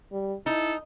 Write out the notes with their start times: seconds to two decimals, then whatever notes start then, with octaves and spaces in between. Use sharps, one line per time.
0.12 G3
0.46 D#4 E4 A4